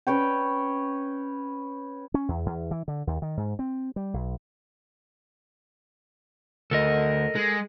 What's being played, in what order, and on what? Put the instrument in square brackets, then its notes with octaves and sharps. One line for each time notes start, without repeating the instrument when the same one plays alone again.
[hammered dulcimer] C#4 B4 C#5 G5
[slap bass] C#4
E2
E2
E3
D3
D#2
D#3
G#2
C4
G3
B1
[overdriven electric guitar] D2 [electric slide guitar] A4 A#4 D#5
[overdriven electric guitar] G#3